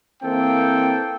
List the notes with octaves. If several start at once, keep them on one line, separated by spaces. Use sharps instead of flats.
E3 A#3 C4 A4 G5